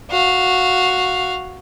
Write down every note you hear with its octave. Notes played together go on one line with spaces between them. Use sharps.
F#4 F5